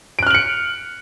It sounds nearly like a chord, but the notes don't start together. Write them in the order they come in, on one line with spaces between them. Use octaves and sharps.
D7 F#6 F6 F#7 C#7